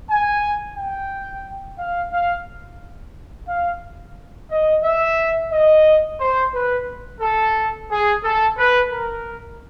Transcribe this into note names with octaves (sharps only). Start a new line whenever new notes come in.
G#5
G5
F5
F5
F5
D#5
E5
D#5
C5
B4
A4
G#4
A4
B4
A#4